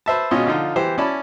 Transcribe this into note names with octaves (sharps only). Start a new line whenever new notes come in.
B4 C5 E5 A5
G#1 B2 C#4 F4 D#5 C6
D3 F3 D#4 F4
E3 G4 C5
C#4 E4 D5 A5 B5